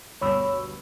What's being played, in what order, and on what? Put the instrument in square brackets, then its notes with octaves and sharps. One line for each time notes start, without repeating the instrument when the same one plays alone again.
[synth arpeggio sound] D2 G2 B2 [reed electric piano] C#5 B5 E6